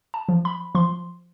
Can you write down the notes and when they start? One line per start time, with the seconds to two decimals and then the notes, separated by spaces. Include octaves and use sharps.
0.14 A5
0.29 F3
0.45 B5
0.75 F3 C6